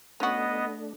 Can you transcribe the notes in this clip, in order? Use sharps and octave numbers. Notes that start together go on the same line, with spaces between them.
A3 B3 C#4 D4 F#4 D#5